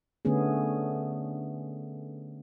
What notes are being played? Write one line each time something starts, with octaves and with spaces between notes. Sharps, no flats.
D3 A3 B3 C#4 G#4